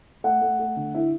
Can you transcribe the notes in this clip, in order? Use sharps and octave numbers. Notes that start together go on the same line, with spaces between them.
A3 F#5
A3
A3
D3
E4